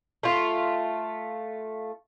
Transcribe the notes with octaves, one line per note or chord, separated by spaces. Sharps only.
A3 F4